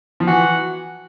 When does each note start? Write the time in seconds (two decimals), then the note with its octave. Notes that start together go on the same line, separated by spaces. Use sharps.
0.20 F3
0.27 E3 F#4